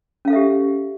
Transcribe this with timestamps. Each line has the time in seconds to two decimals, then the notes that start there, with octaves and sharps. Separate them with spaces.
0.25 C#4
0.28 F5
0.30 A4
0.33 E5
0.35 G4